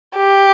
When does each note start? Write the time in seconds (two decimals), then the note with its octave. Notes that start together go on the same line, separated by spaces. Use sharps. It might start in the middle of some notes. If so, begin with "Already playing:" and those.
0.17 G4